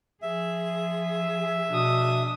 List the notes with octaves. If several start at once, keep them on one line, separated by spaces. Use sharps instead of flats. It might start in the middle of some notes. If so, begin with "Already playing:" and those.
F3 G#4 E5
B2 D4 D#6